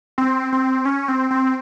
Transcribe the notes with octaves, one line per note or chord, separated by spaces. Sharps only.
C4
C4
C#4
C4
C4